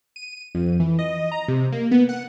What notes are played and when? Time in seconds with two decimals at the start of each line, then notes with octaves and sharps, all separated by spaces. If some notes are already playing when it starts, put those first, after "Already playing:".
0.16 D#7
0.55 F2
0.80 E3
0.99 D#5
1.32 A#5
1.48 C3
1.72 A#3
1.91 B3
2.09 F#5